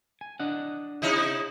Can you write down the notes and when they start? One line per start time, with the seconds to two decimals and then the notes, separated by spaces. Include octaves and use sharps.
0.21 G#5
0.40 D4 D#5 F#5
1.02 C3 D#4 E4